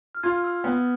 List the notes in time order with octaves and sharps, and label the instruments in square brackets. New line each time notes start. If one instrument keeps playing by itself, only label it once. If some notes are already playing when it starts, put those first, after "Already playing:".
[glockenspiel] F6
[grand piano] F4 [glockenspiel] G#6
[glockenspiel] E6
[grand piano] B3 [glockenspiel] F6